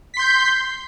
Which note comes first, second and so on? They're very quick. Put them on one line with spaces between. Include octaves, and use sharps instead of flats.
B6 C6 G6